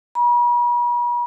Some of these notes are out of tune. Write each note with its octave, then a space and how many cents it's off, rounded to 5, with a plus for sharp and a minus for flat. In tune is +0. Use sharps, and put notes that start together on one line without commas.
B5 -45